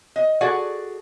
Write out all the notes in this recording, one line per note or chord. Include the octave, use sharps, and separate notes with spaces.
D#5
F#4 G#4 A4 D5 F#5